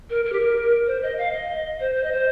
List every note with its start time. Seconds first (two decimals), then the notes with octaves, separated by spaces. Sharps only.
0.10 A#4
0.25 A#4
0.32 G4
0.40 A#4
0.86 C5
1.02 D#5
1.18 F5
1.33 D#5
1.80 C5
1.95 C5
2.03 D#5
2.12 C5